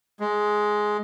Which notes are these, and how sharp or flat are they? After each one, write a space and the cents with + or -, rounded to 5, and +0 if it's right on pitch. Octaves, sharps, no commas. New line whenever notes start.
G#3 +10